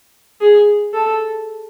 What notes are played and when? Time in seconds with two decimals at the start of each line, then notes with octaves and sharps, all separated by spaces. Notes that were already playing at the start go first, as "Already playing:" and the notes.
0.41 G#4
0.93 A4